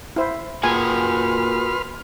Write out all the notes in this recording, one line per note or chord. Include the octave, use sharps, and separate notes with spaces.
E4 C5
A#2 F#4 G#4 B4 G#5 C6 F6